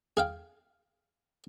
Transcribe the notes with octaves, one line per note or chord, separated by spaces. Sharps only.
G#4 F5 G5